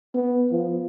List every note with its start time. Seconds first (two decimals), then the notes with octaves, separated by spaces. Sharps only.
0.14 B3
0.52 F3